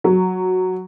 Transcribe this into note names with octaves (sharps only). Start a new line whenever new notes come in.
F#3